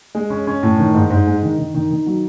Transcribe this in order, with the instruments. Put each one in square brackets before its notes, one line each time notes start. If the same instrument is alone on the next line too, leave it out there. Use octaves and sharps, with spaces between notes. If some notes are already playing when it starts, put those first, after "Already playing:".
[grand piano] G#3
C#4
C#4
A2
D#3
G#2
G#2
G#3
D#3
D#3
D#3
D#3
F#3